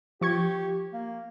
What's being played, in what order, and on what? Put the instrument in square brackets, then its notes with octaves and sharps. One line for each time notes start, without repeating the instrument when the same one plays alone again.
[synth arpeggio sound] F3 C#6 G#6 [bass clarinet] G4
[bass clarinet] A#3